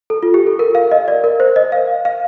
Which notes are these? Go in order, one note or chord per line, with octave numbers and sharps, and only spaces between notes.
A4
F4
G4
A4
A#4
F5
D#5
D5
A#4
C5
D#5
F5
F5